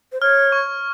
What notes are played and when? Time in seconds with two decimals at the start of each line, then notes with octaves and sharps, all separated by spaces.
0.12 C5
0.21 C#5 F6
0.52 C#6